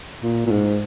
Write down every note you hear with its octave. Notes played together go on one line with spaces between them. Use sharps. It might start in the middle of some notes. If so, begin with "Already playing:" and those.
A#2
A#2
G#2